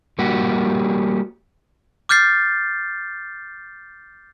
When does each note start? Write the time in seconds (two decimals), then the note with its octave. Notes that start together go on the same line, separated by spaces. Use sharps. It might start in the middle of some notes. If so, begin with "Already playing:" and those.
0.19 G3 A#3 F#4 G4
2.09 D6 F6 G6 A6 C7